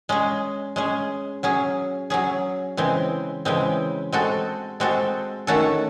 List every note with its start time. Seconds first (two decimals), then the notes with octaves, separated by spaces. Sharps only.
0.09 G#3 C#4 G#4
0.76 G#3 C#4 G#4
1.43 F#3 C#4 G#4
2.10 F#3 C#4 G#4
2.77 C#3 E3 G#3 C4
3.45 C#3 E3 G#3 C4
4.12 G#3 C4 F#4 A4
4.80 G#3 C4 F#4 A4
5.47 D#3 A3 C#4 F#4 A4